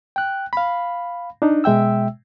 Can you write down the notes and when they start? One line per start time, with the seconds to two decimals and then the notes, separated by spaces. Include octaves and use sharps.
0.16 G5 F#6
0.53 F5 B5
1.42 D4 D#4
1.64 B2 G#3 E5 G5 E6